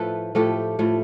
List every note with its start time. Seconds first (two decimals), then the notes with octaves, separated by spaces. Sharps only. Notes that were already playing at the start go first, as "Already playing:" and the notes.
Already playing: A2 F3 A3 A4 B4
0.35 A2 F3 A3 G4 A4
0.79 A2 F3 A3